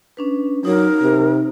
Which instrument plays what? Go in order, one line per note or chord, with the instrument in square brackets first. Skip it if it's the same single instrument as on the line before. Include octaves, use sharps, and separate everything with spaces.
[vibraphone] C#4 D4 B4
[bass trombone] F#3 [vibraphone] D#4 [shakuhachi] A#4
[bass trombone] C3